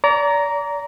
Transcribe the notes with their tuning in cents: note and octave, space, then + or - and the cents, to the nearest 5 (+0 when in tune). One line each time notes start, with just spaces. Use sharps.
D5 -35 A#5 +0